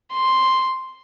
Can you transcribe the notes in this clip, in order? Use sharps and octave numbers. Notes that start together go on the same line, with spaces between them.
C6